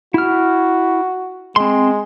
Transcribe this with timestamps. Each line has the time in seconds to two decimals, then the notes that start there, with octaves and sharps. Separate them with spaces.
0.14 E4 F#4 F6
1.56 G#3 C4 C6